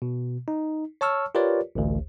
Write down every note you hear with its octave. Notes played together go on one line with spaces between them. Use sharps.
B2
D#4
C#5 A5 C#6 E6 F6
F4 G4 A#4 B4 C#5 D5
A1 D2